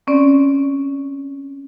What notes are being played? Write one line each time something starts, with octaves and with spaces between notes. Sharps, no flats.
C4 C#4 D5